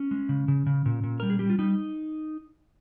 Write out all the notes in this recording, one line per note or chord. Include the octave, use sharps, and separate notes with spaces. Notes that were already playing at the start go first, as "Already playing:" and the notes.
Already playing: C#4
G#3
C#3
C#3
C#3
A#2
A#2
G3 A#4
G#4
G3 G4
F4
G3 D#4